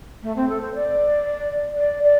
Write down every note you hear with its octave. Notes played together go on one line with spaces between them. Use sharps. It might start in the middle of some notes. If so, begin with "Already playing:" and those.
A3
C4
A4
C5
D5
D5
D5